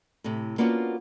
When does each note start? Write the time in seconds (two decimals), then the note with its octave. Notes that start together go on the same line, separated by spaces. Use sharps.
0.24 A2 C3
0.58 A#3 B3 C#4 D4 F4 F#4